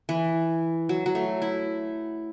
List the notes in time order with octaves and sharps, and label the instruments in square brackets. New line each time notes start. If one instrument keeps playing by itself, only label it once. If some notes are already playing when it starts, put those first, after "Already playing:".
[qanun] E3
F#3
F#3
A3
E4